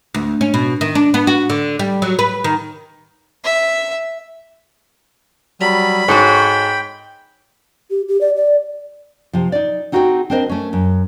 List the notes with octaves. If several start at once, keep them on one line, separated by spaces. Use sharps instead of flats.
D2
C#4
B2
D#3
D4
B3
F#4
D3
G3
F#3
B4
D#3
E5
F#3 G3 B5
G#2 F#4 A4 C#5 G5
G4
G4
D5
D5
C3 F3
D#4 D5
C4 D#4 F#4 G#4 A4 G5
C4 D4 A#4 C5 D#5
A3 C#4
F#2